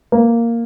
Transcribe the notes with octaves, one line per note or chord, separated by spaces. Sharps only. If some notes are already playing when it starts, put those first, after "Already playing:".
A#3